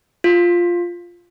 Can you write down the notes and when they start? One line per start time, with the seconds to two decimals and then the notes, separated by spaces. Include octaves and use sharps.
0.24 F4